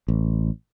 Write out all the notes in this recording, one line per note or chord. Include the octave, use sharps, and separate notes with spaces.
A1